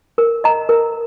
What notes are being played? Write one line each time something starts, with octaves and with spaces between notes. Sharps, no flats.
A#4
D#5 A#5
A#4